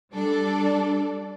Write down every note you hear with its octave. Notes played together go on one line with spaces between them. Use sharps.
G3 D4 A4 D5